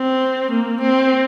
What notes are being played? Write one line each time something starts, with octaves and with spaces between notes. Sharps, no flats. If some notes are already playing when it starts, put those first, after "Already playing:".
Already playing: C4
A#3
C4